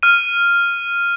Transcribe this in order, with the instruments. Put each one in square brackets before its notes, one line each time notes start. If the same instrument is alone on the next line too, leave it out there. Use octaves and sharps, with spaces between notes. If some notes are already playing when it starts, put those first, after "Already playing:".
[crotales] F6 D#7